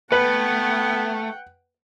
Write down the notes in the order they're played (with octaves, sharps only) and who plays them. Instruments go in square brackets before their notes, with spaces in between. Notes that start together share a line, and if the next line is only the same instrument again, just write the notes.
[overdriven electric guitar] A3 [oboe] B3 [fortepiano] B4 [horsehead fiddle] F#5 G5